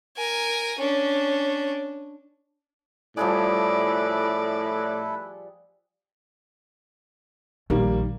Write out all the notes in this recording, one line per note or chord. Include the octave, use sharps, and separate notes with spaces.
A#4 G#5
C#4 D4
A2 F3 G3 E4 G#4 A4 B4 D5
A#1 D#3 G3 A#3